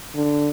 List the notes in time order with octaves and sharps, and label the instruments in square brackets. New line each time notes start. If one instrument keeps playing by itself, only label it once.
[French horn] D3